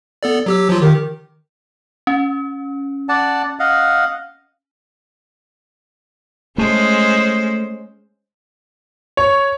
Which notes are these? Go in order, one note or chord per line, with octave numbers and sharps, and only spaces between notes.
B3 A4 D5
F#3 G4 E6
F3 F#3 F4
D#3 G4
C#4
D5 F#5 A5
D#5 F5 F#5
G#3 A3 C#4 C5
C#5